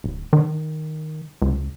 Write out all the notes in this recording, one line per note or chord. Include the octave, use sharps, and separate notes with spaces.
D1
D#3
C#2